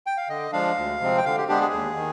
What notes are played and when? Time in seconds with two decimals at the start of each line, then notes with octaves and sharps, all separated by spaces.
0.06 G5
0.17 F5
0.29 D3 D#5
0.53 F3 G#3 D4 F5
0.77 D2
1.01 C3 F3 G#3 C4
1.17 G5
1.25 D3 F5
1.38 G4
1.48 G#3 B3 D4 G4
1.61 G#4
1.73 D#2
1.97 D#3